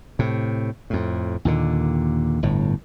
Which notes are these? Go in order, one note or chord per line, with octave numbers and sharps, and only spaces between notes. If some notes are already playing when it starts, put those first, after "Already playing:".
A2 C3
F2 A2
D#2 A#2 D3
G1 A2